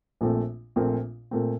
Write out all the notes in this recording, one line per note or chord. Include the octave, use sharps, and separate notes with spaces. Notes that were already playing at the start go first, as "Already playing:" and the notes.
A#1 A#2 A3 C4
A#1 A#2 A3 C4
A#2 A3 C4